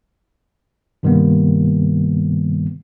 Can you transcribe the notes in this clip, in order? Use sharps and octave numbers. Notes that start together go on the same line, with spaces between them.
G2 C3 D#3 G3 A#3 B3